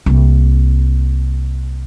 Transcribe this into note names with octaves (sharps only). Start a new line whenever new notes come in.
C2 A#3